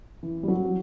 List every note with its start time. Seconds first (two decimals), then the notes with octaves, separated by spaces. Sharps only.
0.23 E3
0.43 G3
0.48 F#3